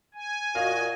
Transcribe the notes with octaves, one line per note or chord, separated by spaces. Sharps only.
G#5
A#2 F#4 D#5 F5